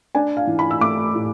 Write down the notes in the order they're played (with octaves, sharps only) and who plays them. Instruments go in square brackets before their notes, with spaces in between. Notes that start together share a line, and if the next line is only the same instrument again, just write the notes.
[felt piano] D4 G#5
F5
E3
B5
E6
A3 D6
A2